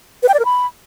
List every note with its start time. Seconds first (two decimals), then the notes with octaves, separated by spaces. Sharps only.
0.23 B4
0.28 G5
0.34 D5
0.39 A#4
0.45 B5